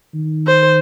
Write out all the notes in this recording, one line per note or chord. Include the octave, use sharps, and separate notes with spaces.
D#3
C5